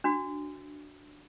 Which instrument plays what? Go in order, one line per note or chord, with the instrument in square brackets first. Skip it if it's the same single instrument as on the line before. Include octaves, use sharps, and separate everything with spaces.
[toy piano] D4 F#4